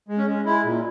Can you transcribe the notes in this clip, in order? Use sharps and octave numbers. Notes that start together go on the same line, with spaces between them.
G#3
C#4
G#3
G#3 E4
A#2